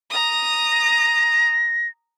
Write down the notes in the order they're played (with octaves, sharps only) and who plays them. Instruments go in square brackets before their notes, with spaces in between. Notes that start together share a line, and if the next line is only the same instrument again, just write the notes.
[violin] A#5 D#6
[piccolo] A#6